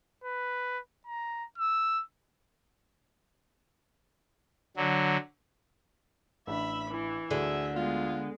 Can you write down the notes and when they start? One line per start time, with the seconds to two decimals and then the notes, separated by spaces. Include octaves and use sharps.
0.24 B4
1.07 A#5
1.58 E6
4.77 D3 F#3
6.47 A1 D4 E5 B5
6.90 E3
7.31 D2 D3 A3 G#4 E5
7.76 G#3 B3 F4